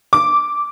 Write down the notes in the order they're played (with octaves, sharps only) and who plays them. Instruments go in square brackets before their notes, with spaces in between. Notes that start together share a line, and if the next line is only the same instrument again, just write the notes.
[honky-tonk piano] D6